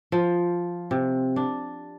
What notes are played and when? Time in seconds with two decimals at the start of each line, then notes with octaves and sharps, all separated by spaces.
0.12 F3
0.91 C3
1.36 D4